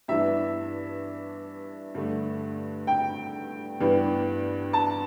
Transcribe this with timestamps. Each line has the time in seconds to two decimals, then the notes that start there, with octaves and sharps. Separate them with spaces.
0.08 G2 E3 B3 D4 E5
1.95 G2 D3 A3 D4
2.87 G5
3.80 G2 E3 B3 D4
4.73 A5